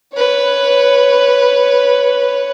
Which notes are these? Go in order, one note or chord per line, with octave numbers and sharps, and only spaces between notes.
B4 C#5